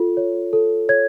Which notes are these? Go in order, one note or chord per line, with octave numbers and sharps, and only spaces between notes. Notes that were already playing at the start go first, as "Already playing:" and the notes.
Already playing: F4 A4
C#5
A4
C#5 G#6